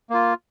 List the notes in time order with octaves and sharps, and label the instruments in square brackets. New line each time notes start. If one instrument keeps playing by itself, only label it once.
[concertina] A#3 F4